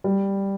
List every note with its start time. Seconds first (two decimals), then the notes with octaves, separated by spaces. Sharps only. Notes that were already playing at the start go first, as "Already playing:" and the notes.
0.04 G3